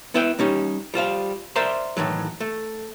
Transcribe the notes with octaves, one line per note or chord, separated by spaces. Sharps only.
B3 E4 B4 E5 G5
G3 C#4 D#4
G3 F4 C5 F5
A#4 C5 D5 E5 A#5 C6
A2 D#3 E3 F#3
A3